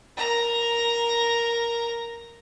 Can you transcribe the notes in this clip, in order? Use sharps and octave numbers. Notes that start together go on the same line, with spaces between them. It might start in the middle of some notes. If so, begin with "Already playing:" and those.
A#4 A#5